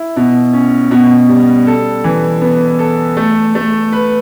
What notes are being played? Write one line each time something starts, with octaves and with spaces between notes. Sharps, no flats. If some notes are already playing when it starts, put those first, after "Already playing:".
Already playing: E4
B2
C#4
B2
G3
A4
E3
B3
A4
A3
A3
B4